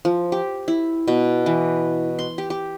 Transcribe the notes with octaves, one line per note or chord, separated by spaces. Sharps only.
F3
G4
E4
B2
E3
C6
G4
G4